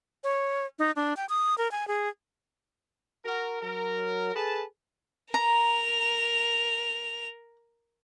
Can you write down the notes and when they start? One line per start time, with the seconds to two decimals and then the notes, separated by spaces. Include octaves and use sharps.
0.24 C#5
0.79 D#4
0.96 D4
1.17 G5
1.29 D#6
1.58 A#4
1.71 G#5
1.88 G#4
3.25 F#4 A#4
3.61 F#3 A#4
4.35 G#4 A4 B4 A5
5.34 A#4 A#5 F7